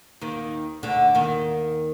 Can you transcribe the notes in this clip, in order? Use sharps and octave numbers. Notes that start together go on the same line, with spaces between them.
D#2 D#3
D2 D3
D#2 D#3